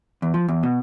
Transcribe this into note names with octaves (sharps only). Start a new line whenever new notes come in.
E2
F3
E2
B2